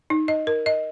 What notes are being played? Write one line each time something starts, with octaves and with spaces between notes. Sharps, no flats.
D#4
D#5
A#4
D#5